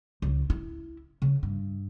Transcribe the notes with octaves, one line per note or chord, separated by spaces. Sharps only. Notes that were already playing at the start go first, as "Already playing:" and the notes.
C#2
E4
C#3
G2